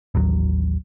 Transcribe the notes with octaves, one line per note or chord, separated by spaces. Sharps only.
A1 D#2 F#3